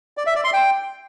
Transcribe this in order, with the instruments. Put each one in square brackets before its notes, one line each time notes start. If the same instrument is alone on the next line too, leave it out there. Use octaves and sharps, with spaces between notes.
[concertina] D5
E5
D5
C6
G5